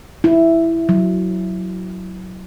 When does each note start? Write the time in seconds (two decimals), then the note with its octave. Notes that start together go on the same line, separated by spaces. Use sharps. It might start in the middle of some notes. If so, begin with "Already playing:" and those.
0.24 E4
0.89 F#3